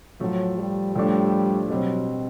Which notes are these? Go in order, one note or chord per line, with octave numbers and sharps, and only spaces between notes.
A2 F3 F#3 A3
G3
A2 F3 G3 A3 D4
B2 F#3 G3 C4